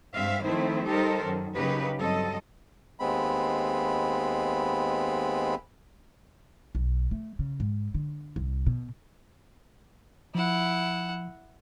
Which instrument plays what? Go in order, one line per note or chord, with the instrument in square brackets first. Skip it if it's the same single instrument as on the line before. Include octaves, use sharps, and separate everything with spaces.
[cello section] G2 G#3 C4 E5 F5
D#3 F3 A3 C4 E4 C5
G3 D#4 G4 A4 A#4 C5
F#2 D#3
C#3 F#3 A#3 D#4 G4 B4
G2 F#3 C4 A4 D#5
[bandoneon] D#2 G#3 B3 C4 B5
[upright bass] B1
A3
C#3
G#2
D3
C2
B2
[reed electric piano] F3 [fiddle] E4 F#5